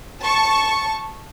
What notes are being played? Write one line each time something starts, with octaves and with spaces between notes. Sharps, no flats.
A5 C#6